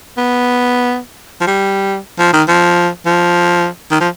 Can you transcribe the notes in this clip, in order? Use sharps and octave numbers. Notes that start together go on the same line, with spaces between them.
B3
F3
G3
F3
D#3
F3
F3
D#3
F3